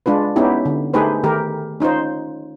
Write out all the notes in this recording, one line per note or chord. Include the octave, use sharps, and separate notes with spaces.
G#3 D4 F4 B4
B3 C#4 D#4 E4 G4
D3
A3 D#4 G4 G#4 B4 C5
D#3 A3 G4 A#4
C#4 D#4 F4 C5